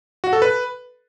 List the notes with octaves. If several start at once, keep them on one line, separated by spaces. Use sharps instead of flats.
F#4
A4
B4